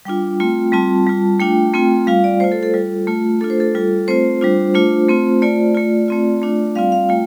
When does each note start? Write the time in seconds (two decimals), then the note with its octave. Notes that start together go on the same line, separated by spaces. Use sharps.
0.05 G3 D4 F4 G5
0.40 A3 C4 F4
0.72 G3 C4 F4 A5
1.07 G3 F4
1.40 A3 D4 F4 G5
1.74 A3 C4 F4
2.07 G3 F4 F5
2.24 D5
2.40 A3 F4 C5
2.52 A4
2.63 A4
2.74 G3 F4
3.07 A3 F4
3.41 A3 D4 F4 A4
3.50 C5
3.60 A4
3.75 G3 F4
4.08 A3 C4 F4 C5
4.41 G3 D4 F4
4.74 A3 D4 F4
5.09 A3 C4 F4
5.42 A3 F4 D5
5.75 A3 F4
6.08 A3 C4 F4
6.42 A3 D4 F4
6.75 G3 C4 F4 F5
6.92 F5
7.09 A3 F4 G5